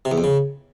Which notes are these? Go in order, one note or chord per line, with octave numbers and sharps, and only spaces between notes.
C3
E2
F2
C#3